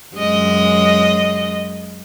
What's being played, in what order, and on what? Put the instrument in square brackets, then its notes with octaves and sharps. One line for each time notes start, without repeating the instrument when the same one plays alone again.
[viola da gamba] F#2 G#3 D#5